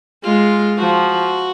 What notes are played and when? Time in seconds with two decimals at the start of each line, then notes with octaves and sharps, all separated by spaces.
0.24 G#3 F4
0.79 F3 F#4